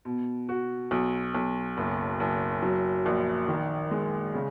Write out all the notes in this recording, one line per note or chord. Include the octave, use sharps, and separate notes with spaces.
B2
F#4
B1
B1
F#1
F#1
F#3
A#1
D#3
G#3
C#3